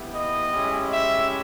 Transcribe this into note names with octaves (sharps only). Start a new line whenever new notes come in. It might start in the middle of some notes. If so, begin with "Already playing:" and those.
Already playing: B3 E4 G4
D#5
G#3 C#4 E4 G4
E5